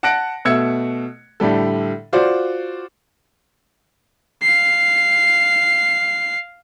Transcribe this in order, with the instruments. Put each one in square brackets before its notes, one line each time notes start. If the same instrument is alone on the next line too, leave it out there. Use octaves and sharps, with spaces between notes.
[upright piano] F#5 A5 F#6 A#6 C#7 D7
B2 A3 E6 G#6 C#7
A2 D3 G3 A4
F4 F#4 C5 D5
[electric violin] F5 C7